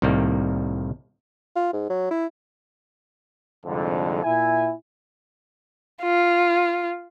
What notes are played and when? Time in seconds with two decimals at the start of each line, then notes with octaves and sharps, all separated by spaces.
0.02 C2 A2 D#3 G3 A#3
1.56 F4
1.73 G#2
1.90 F#3
2.11 E4
3.65 C2 F2 G#2 D3
4.23 A#2 E4 E5 G#5
6.03 F4